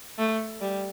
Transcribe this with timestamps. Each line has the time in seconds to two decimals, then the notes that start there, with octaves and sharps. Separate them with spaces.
0.18 A3
0.61 G3